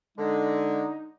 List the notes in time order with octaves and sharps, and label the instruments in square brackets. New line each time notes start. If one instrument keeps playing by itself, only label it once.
[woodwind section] D3 G#3 [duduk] D#4